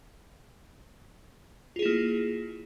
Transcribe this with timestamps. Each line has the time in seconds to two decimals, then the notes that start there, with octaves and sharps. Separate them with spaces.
1.76 F4
1.79 G#4
1.82 E4
1.85 A#3